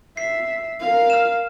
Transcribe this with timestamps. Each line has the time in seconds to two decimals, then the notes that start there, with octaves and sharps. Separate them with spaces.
0.17 E5 C7
0.80 A#4 F5
1.10 F6 E7